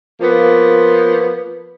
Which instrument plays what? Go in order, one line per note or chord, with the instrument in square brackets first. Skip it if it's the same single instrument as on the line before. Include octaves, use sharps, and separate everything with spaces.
[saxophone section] F3 A#3 B3